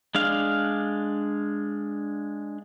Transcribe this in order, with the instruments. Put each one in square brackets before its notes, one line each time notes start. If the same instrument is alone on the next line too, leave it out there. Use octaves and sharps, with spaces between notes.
[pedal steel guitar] G#3 D4 F5